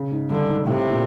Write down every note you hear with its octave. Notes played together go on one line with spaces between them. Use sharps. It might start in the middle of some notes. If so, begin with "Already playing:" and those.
Already playing: C#3
G#2
G2 D3
G#2
A2 C3
A#2